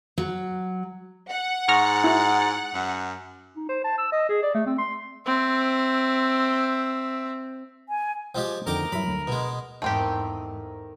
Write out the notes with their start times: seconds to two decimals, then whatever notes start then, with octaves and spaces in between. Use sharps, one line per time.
0.18 F#3
1.30 F#5
1.68 G#2 C#6 F6 A#6
2.04 E4 F#4
2.75 F#2
3.56 D#4
3.69 C5
3.84 A5
3.98 E6
4.12 D#5
4.29 G#4
4.43 D5
4.54 A3
4.66 C4
4.78 C6
5.26 C4 E5
7.89 G#5
8.35 F3 G#3 G4 D#5 F5 G5
8.67 F2 D3 D#3 A#4 D#5 G5 D6
8.92 G2 F#3 E4 B5
9.08 D2
9.27 B2 G#3 B4
9.82 E2 G#2 D#3 A3 C4 G4 A#4